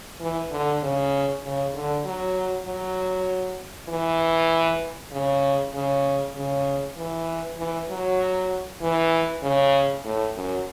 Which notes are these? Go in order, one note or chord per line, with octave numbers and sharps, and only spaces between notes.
E3
D3
C#3
C#3
D3
F#3
F#3
E3
C#3
C#3
C#3
E3
E3
F#3
E3
C#3
A2
F#2